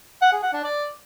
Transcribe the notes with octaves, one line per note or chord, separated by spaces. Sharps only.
F#5
G#4
F#5
D4
D5